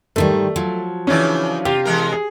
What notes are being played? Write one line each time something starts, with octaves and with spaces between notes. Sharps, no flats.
G#2 D#3 G3 A3
F3 F#3
C#3 E3 C#4 D4 D5
C3 F4 G4
E3 G#3 A#4
G#4